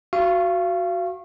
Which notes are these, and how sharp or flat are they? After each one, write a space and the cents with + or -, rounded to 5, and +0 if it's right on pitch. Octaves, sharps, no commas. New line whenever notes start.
F#4 +0 F5 -30 C#6 -30